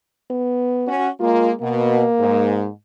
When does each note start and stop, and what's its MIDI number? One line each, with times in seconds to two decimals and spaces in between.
0.31 0.89 59
0.87 1.09 61
0.87 1.09 66
1.20 1.53 56
1.20 1.53 58
1.20 1.50 65
1.61 2.04 47
1.61 2.69 58
2.20 2.68 44